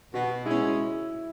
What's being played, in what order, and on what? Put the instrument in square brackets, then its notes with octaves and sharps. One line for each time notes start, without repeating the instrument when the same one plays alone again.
[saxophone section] B2 [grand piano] F#4
[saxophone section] G#3 [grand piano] E4
[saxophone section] C#4